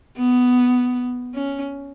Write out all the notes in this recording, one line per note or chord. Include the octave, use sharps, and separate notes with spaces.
B3
C#4